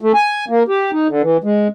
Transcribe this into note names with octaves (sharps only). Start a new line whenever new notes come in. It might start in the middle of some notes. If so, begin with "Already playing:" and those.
A3
G#5
A#3
G4
D#4
D3
E3
G#3